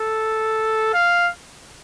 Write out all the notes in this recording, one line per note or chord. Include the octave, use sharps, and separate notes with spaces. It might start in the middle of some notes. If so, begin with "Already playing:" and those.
Already playing: A4
F5